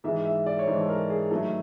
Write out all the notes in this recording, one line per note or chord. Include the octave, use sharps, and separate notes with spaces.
G#2 E3 G#3 E5
E5
D5
C#5
G#2 E3 G#3 C5
A4
A#4
G#4
G2 D#3 F#3 A3 A4